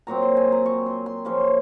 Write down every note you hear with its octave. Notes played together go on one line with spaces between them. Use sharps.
A#2 F#3 C4 A#5
C6
G#5
A#5
C#6
C6
C6
C#3 F3 A#3 C#4 C6
C6